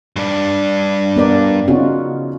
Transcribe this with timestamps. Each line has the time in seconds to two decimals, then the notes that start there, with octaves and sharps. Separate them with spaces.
0.16 G2 D4
1.16 B3 A#4 D5
1.68 C#3 C#4 D#4 F4 F#4